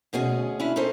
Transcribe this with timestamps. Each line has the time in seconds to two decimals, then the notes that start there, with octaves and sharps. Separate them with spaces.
0.13 D2 B2 C#4 G#4 G#5
0.60 C#4 D4 E4
0.76 C#4 D#4 E4 A4 C5